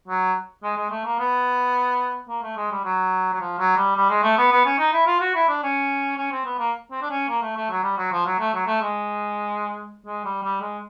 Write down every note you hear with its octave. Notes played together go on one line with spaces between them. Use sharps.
F#3
G#3
G#3
A3
A#3
B3
A#3
A3
G#3
G3
F#3
F#3
F3
F#3
G3
G3
G#3
A3
B3
B3
C#4
D#4
E4
F4
F#4
E4
D4
C#4
C#4
C4
B3
A#3
C4
D4
C#4
A#3
A3
A3
F#3
G3
F#3
F3
F#3
A3
F#3
A3
G#3
G#3
G3
G3
G#3